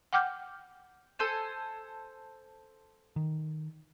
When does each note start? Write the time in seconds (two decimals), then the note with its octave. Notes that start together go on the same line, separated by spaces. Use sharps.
0.13 F#5 G5 D6 F6 G6
1.19 A4 C5 G#5
3.16 D#3